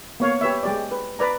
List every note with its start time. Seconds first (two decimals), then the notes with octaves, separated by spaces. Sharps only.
0.20 A#3 B3 C#5 F5
0.41 G4 B4 C#5 E5
0.63 G#3 G4 D5
0.91 B4
1.19 B4 D5 A#5